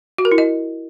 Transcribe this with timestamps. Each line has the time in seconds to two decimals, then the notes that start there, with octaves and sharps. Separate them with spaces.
0.18 F#4
0.25 A#4
0.32 E4
0.38 D#5